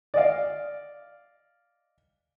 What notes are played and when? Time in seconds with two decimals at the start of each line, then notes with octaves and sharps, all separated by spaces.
0.14 D5 D#5 F5